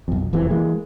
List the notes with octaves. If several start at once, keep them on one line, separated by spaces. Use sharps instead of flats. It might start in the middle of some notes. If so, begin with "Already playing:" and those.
B1 F2
E1 F2 C3 E3
E3 G#3 A#3